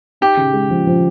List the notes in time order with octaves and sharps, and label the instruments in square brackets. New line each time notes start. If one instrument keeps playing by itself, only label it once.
[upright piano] D#4 [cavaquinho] G4
[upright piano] C#3
G#3
F3
F3